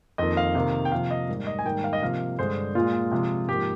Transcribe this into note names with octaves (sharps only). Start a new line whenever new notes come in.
F2 D#3 A#3 D#5
F5
C3 D#3 A#3
G5
C3 F3 A#3 F5
D#5
G#2 G3 A#3
D#5
G#5
G#2 D#3 G3 A#3 G5
F5
D#5
C3 F3 A#3 F5
G2 D3 G#3 C5
A#2 G#3 F4
C3 F3 G#3
G#2 F3 A#3 G4